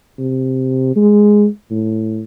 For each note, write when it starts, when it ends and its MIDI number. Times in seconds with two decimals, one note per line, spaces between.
0.19 0.95 48
0.96 1.47 56
1.71 2.23 45